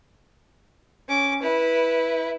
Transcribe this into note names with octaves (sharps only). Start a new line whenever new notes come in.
C#4 D6
E4 B4